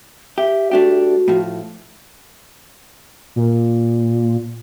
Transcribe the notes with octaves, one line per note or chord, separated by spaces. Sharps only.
G4 E5
A3 D4 F#4 G4
A2 F3
A#2